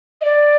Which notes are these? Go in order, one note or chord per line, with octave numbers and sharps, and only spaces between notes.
D#5
D5